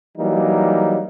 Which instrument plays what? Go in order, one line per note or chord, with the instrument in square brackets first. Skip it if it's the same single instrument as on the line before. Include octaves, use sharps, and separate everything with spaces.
[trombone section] E3 F#3 G3 A#3 D#4